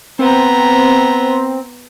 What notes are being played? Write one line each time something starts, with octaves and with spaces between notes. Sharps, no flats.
B3 C4 A#5